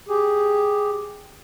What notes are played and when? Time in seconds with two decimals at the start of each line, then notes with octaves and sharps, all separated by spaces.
0.08 G4 G#4